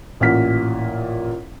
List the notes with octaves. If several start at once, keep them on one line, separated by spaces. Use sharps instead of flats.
A1 A#2 F#5 F6 B6